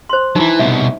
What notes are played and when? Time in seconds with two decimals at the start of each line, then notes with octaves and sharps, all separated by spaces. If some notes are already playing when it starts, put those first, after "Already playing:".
0.09 C5 C6
0.36 E3 F#3 D#4 E4
0.59 C2 B2 E5